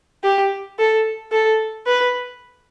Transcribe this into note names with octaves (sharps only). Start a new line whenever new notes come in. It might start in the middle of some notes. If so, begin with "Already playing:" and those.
G4
A4
A4
B4